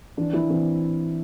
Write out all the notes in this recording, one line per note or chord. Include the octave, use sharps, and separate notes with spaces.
E3 D4
E3 E4
E3 C4